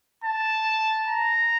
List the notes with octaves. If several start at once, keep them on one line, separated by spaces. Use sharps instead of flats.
A5
A#5